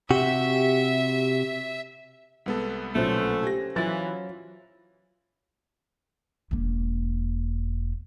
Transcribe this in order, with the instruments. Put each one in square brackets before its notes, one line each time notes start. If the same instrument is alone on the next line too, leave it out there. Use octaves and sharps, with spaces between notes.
[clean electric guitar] C3 F#4 [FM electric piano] G4 [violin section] E5
[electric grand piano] C2 B3 A4 [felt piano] G#3
[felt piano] B1 A#2 [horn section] D3 A3 [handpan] C#4 C5
[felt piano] G4 [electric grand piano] G#5 A#6
[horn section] E3 [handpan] F#3 F4 [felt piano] A6
[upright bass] E1 A#3